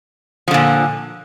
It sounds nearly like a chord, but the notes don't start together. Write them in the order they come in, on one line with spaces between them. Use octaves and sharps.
F3 D3 A#2